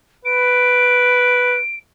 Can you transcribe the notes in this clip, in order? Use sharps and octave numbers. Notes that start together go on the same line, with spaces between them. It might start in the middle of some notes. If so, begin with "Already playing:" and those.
B4 D7